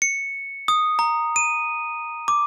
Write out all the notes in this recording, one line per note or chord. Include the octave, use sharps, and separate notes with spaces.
C#7
D#6
A#5
D#7
D6